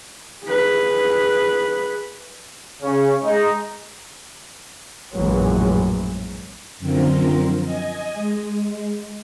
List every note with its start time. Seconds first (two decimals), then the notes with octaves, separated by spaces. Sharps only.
0.45 G#4 B4
2.82 C#3 C#4
3.24 G#3 D#4
5.14 A#1 F#2 A2 E3 F#3 G#3
6.79 F#2 D3 F3 C4 F4 A#4
7.63 D#5 G#5
8.14 G#3